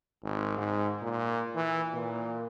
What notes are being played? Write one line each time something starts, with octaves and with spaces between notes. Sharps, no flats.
G#1
G#2
A#2
E3
A#2